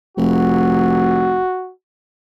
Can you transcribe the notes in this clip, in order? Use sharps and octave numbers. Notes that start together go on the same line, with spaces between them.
F1 F#4